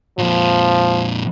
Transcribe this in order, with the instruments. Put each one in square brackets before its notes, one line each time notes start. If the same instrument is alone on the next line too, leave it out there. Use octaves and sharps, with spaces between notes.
[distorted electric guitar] F2 A#2 [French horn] F3